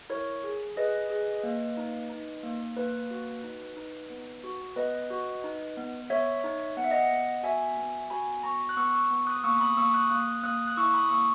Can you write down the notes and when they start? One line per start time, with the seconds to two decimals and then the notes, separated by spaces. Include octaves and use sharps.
0.10 E4 A#4 C#5
0.44 G#4
0.76 G#4 B4 D#5
1.10 G#4
1.43 A#3
1.77 D#4
2.10 D#4
2.43 A#3
2.77 A#3 B4
3.11 F#4
3.44 D#4
3.76 D#4
4.10 B3
4.44 F#4
4.76 B3 B4 D#5
5.10 F#4
5.44 D#4
5.77 B3
6.10 B3 C#5 E5
6.44 D#4
6.77 B3 F#5
6.84 E5
6.91 D#5 F#5
7.11 B3
7.43 F#4 E5 G#5
7.77 B3
8.10 F#4 G#5 B5
8.43 B3 A#5 C#6
8.69 F#6
8.77 B3 C#6 E6
8.94 C#6 E6
9.10 B3
9.27 D#6 F#6
9.44 A#3 C#6 E6
9.60 B5 D#6
9.77 A#3 C#6 E6
9.94 D#6 F#6
10.10 A#3 D#6 F#6
10.44 A#3 D#6 F#6
10.67 F#6
10.77 E4 C#6 E6
10.94 B5 D#6
11.10 A#3 C#6 E6